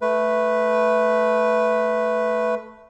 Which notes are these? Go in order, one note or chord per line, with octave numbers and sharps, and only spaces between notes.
A3 B4